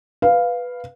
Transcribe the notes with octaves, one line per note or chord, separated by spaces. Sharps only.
B4 F5